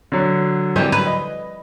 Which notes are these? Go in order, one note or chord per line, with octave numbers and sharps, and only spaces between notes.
D3 F#3
E3 G3 C4
B4
D#5